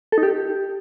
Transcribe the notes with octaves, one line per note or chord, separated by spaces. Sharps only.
A4
D#4
G4